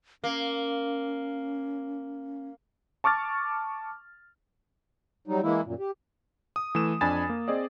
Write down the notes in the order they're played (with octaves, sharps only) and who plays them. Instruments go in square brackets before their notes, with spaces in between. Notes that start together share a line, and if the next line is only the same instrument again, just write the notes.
[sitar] A#3 [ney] C#4
[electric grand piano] A5 C#6 D6 F6 A6
[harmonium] F#3 G3 D#4
E3 G#3 A#3 E4
F#2 A#2
G4
[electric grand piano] D#6
E3 A3 E7
F2 D4 G#5 B5 A6 E7
A#3
C4 G#4 D5 D#5